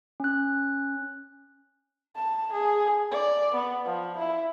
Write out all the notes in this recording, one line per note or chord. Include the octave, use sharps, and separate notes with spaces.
C#4 F#6
A5
G#4
D5
B3
F3
E4